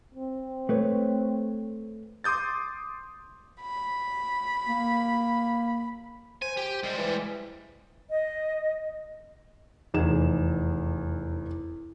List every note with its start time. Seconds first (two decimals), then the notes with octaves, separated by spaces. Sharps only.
0.15 C4
0.69 A3 B4 C#5
2.24 C6 D6 D#6 G6 A6
3.62 B5
4.67 A#3
6.42 C5 G#5
6.57 G4
6.83 G3 G#3
6.98 E3
8.09 D#5
9.94 F1 E2 D#4 G#4 E7